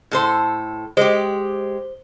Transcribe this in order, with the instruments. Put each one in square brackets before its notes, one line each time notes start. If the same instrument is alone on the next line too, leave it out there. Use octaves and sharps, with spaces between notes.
[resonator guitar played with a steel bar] A2 A4 C5
[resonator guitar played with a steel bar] G#3 G4 [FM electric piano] C5